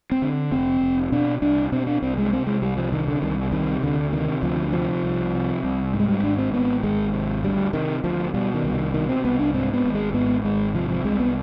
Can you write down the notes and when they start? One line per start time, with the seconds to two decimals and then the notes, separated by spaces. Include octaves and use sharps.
0.12 C4
0.22 D3
0.52 F1 C4
0.81 F1
1.12 B2 D4
1.42 C2 D4
1.72 B2 C4
1.87 D4
2.02 C2 C4
2.18 G#3
2.32 C3 C4
2.47 G#3
2.62 C2 G3
2.77 F3
2.92 C3 D#3
3.08 D3
3.22 C2 D#3
3.52 C3 D#3
3.83 D2 D3
4.12 C3 D#3
4.43 D2 F3
4.73 C3 F3
5.03 C2
5.34 C3
5.63 C2
5.93 G#2
6.00 G#3
6.09 G3
6.23 G#1 D4
6.38 C4
6.53 G#2 B3
6.83 G#1 G#3
7.13 C3
7.43 D2 G3
7.73 C3 D#3
8.04 D2 F3
8.34 B2 G3
8.54 D#3
8.64 C2
8.74 D#3
8.93 B2 D#3
9.09 C4
9.24 C2 B3
9.39 D4
9.54 G#2 C4
9.74 B3
9.84 G#1
9.94 G#3
10.14 G#2 B3
10.44 G#1 G#3
10.74 C3 F3
10.90 F3
11.04 C2 G#3
11.20 B3